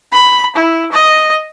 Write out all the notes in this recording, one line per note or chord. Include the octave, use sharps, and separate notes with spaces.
B5
E4
D#5